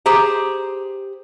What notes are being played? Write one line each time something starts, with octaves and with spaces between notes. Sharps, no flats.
G4 G#4 C5 A#5